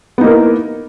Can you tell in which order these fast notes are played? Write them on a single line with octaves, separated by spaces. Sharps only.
B3 D#4 A#3 A#4 E4